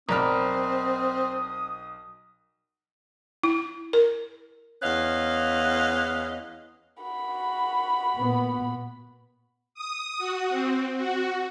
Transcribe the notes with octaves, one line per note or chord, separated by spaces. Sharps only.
B1 C4 A#4 D5 B5 D#6 F6
E4
A#4
E2 C#4 B4 D#5 F5
F#4 B5
A#2 B3
D#6
F#4
C4
F#4